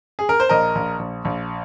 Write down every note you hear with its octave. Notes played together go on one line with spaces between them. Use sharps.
G#4
A#4
C5
A#1 A#4 D#5
A#1
A#1
A#1